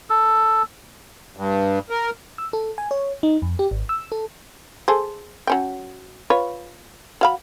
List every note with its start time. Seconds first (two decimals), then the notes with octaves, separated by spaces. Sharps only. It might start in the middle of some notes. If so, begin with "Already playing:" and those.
0.10 A4
1.36 G2
1.90 A#4
2.38 E6
2.53 A4
2.78 G#5
2.91 C#5
3.23 D#4
3.42 F2
3.59 G4
3.71 G#1
3.89 E6
4.12 A4
4.88 G#4 A4 C5
5.47 F#3 C#4 G5
6.30 F4 B4 C#5
7.21 F#3 F5 B5